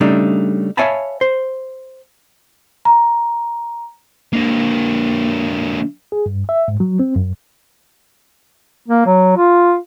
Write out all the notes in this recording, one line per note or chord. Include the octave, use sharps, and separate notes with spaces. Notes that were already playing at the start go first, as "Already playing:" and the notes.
C#3 G3 A3 D4 D#4
C#5 E5 F5 G#5 A5 B5
C5
A#5
D3 A#3
G#4
G2
E5
G#2
F#3
C4
F#2
A#3
F#3
F4